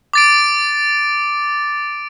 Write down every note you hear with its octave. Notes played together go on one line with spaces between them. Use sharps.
D6 A6 D7